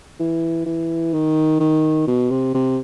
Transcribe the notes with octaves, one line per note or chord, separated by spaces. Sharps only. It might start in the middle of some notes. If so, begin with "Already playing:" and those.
E3
E3
D#3
D#3
B2
C3
C3